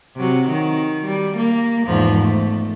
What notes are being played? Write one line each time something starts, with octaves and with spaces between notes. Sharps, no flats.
C3 F#3
D#3
G3
A#3
E2 G#2 F3
A3